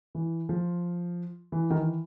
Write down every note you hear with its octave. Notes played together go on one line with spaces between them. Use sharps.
E3
F3
E3
D#3
E3